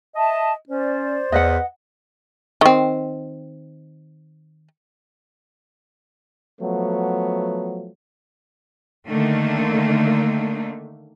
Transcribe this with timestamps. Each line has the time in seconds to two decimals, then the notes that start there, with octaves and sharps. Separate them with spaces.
0.15 D#5 E5 A5
0.69 C#4 C5 D5
1.32 E2 B4 D#5 F#5
2.61 D#3 C4
6.61 F3 F#3 A3 B3
9.07 D3 D#3 A3 A#3